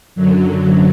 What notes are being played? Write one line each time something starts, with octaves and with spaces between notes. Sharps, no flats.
F#2 D3 F#3